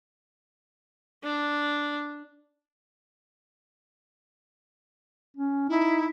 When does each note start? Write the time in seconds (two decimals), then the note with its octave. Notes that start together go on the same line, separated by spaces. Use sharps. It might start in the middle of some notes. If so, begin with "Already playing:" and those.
1.23 D4
5.37 C#4
5.69 D#4 E4